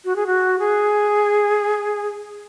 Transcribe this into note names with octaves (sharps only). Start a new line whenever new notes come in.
F#4
G#4
F#4
G#4